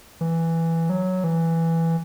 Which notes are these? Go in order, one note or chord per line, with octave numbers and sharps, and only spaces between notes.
E3
F#3
E3